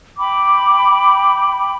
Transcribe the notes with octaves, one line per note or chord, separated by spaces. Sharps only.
G5 B5 D6